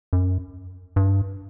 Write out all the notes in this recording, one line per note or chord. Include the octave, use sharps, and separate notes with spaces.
F#2
G2